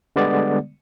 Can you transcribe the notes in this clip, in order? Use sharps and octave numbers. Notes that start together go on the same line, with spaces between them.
D3 G3 G#3 B3 D5